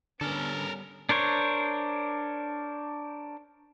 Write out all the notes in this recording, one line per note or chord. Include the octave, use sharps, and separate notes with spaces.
D3 G3 B3 C#4 A4 A#4
D4 A#4 C5 C#5